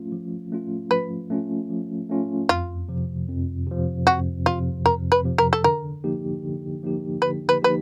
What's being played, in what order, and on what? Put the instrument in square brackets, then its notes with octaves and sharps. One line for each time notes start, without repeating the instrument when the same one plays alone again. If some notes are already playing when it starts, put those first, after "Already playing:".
Already playing: [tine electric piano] F3 A3 C#4 F4
F3
A3 C#4 F4
[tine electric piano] F3 [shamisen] B4
[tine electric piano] A3 C#4 F4
F3
A3 C#4 F4
[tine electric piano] F2 [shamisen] F4
[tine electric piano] C3 F3
F2
C3 F3
[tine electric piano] F2 [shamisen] F#4
[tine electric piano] C3 F3 [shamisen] F4
[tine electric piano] F2 [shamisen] A#4
[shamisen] B4
[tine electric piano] C3 F3
[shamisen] A#4
A4
[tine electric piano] D3 [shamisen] A#4
[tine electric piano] F3 A#3 D#4 G4
D3
F3 A#3 D#4 G4
[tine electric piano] D3 [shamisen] B4
[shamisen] B4
[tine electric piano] F3 A#3 D#4 G4 [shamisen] B4